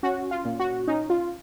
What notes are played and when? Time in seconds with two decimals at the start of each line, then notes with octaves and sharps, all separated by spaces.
0.03 C#4 F#4
0.31 F4
0.45 A#2
0.59 F#4
0.87 C#4 D#4
1.10 F4